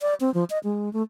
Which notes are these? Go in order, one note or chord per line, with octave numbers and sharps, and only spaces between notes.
D5
C4
F3
D#5
G#3
A3